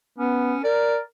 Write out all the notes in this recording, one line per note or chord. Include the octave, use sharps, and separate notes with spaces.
B3 C#4
A#4 D5